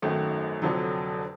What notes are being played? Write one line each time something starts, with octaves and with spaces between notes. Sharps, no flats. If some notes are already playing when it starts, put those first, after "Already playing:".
G#1 F#2 D#3 F#3 A3
F1 F2 D3 F#3